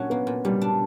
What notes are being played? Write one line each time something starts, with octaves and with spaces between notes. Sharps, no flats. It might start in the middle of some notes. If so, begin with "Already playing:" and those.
Already playing: A#2 F#3 C#4 D4
A#3 B3
A#2
A#2 G3
D4